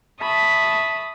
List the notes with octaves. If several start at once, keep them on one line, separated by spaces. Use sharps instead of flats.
E5 A5 B5 C#6 D#6